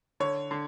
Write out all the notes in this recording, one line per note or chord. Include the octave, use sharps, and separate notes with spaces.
D3 C#5
D3